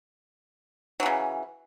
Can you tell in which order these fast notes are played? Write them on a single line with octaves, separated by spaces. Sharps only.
F#3 E3 C#3